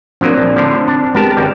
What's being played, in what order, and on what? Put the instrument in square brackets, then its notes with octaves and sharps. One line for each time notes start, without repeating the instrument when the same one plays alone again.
[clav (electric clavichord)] F3 F#3 A#3 [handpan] C4 D4
[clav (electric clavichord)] A#1
A2 D3 F3
[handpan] C4 [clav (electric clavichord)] D4
[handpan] G#3 G4 [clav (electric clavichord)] B3 A#4 A5
[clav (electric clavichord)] G#1 C#2 G3